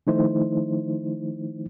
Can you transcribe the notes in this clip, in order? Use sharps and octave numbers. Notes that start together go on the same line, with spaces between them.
D#3 F3 A3 D#4 E4 C5